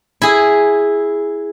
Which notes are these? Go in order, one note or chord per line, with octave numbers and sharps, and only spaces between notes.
E4 G#4